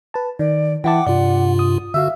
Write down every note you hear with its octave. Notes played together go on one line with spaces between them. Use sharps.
B4 A5
D#3 D5
E3 E4 F#5 G5 A5 D6
G2 C3 F4 D5
D#6
D3 F#4 E5 F5 E6